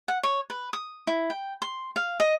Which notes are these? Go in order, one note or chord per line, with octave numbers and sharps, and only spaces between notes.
F#5
C#5
B4
D#6
E4
G5
C6
F5
D#5